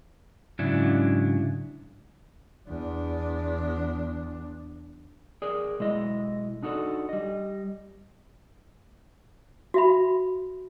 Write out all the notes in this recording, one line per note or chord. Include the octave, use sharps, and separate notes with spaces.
G#2 C#3 F#3 D4 E4
E2 D4
G#4 A#4 D5
B1 G#3 E4 D#5
D4 D#4 F#4 G4 A4 D5
G3 D#5
F#4 E5 B5